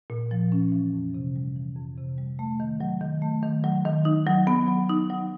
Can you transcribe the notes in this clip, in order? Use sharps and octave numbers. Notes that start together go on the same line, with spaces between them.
A#2
F3
C#4
E3
F2
C3
G3
E3
F2
C3
G3
A3
D#3
F#3
D#3
A3
D#3
F#3
D#3
D#4
F#3
B3
F#3
D#4
F#3